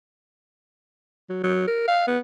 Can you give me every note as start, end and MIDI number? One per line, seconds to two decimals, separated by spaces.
1.29 1.43 54
1.43 1.64 54
1.67 1.87 70
1.87 2.04 77
2.07 2.19 59